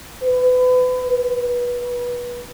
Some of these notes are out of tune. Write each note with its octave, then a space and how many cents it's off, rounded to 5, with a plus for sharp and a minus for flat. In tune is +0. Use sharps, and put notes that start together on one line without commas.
B4 +30
B4 -25